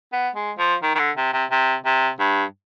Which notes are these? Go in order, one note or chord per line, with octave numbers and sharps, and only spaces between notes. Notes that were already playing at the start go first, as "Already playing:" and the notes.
B3
G#3
F3
D#3
D#3
D3
C3
C3
C3
C3
G2